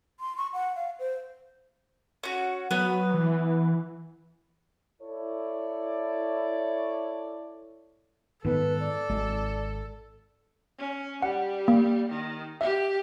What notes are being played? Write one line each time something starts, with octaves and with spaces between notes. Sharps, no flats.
C6
C#6
F#5
F5
C5
C#4 F#4
F#3 B3 B4
E3
E4 A4 C#5 D5
G#2 D#3 B3 A4 B4
D5
G#1 G#3
C#4
G3 F#5
A#3
D#3
G4 E5